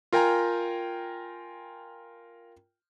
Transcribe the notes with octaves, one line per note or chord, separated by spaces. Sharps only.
F4 A#4 G5 G#5 A#5